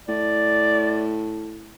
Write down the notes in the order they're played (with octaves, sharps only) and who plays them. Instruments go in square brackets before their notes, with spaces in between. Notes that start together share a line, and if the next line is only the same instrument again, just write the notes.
[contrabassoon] A2 [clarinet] D5